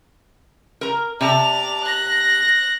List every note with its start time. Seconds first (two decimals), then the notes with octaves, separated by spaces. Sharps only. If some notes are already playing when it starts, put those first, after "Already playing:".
0.81 A#4 A#5
1.21 C3 D5 A5 F7
1.83 F#6 A#6